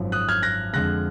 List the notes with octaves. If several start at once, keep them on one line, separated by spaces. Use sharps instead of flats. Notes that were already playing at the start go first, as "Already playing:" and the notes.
Already playing: G#1 F#2 F3
D#6 F#6
F6 G#6
F#6 A#6
F2 D3 G#3 F#6 A#6